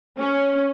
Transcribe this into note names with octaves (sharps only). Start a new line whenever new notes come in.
C#4